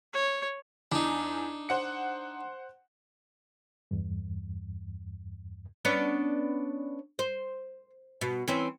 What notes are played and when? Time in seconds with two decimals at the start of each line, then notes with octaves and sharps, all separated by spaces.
0.13 C#5
0.92 E2 D4 D#4
1.69 C5 F#5 C#7
3.91 E2 G2
5.85 B3 C#4 D4
7.19 C5
8.21 B2
8.48 E3 C4 C#4